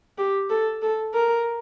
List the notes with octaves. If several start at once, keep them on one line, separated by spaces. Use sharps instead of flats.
G4
A4
A4
A#4